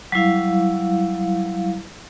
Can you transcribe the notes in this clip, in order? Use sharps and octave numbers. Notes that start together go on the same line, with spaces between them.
F#3 G3 E4 F5